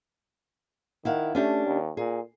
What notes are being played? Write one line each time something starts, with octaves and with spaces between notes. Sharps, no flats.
D#3 E4 F5 F#5
A3 C#4 D4 G4
D#2
A#2 G#4